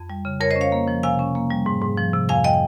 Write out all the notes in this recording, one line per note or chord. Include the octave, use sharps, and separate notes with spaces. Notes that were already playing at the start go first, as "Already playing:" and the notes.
Already playing: F2
G3
C#3
F2 A#4 C#5
C5 D#5
C#4
C#5 F5
A#3
F3
C3 F5 G#5
C#4
A#3
G3
G#2
G#2
F3
C3
F2 F5 G#5
D#5 G5